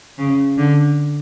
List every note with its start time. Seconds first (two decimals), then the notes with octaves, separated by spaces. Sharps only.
0.18 C#3
0.58 D3